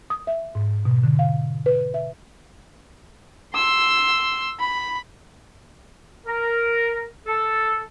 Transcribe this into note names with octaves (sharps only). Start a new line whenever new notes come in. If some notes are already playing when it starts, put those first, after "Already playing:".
D#6
E5
G#2
B2
D3
F5
B4
E5
C6 E6
B5
A#4
A4